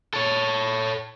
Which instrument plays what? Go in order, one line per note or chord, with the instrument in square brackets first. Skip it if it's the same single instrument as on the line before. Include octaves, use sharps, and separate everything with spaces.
[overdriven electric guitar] A4 C#5